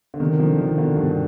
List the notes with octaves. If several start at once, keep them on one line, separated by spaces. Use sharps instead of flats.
D3
C3 D#3
D3 F3
C3 D#3
B2 D3
G2 B2